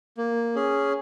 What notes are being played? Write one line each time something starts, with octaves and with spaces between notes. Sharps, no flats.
A#3
C#4 G#4